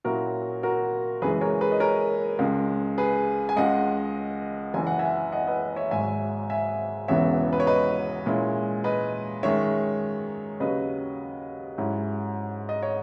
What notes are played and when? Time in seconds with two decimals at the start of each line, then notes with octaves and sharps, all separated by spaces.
0.04 A#2 F#3 C#4 E4 F#4 A#4
0.63 F#4 A#4
1.21 F#1 F#2 E3 G#3 G#4 B4
1.41 A#4 C#5
1.61 G#4 B4
1.72 D#5
1.80 A#4 C#5
2.39 C#2 C#3 G#3
2.98 G#4 B4
3.49 G#5
3.56 C#2 C#3 G#3 D#5 F#5
4.74 F#1 F#2 E3 G#5
4.87 F#5
4.99 E5 G#5
5.32 D#5 F#5
5.47 B4 D#5
5.76 C#5 E5
5.91 G#1 G#2 F#3 E5 G#5
6.50 E5 G#5
7.08 E1 E2 C#3 E3 B3 C#5 E5
7.53 B4
7.60 C#5
7.67 B4 D#5
8.26 A#2 G#3 C#4 E4
8.84 B4 D#5
9.43 F#2 D#3 G#3 C#4 C#5 E5
10.60 D#2 C#3 F#3 B4 D#5
11.78 G#2 F#3 C#4 E4
12.69 D#5
12.83 C#5